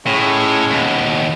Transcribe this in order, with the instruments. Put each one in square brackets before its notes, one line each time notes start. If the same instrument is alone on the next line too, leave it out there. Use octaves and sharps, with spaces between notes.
[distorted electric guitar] A2 [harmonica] G#3 C#4
[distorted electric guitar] D#2 B2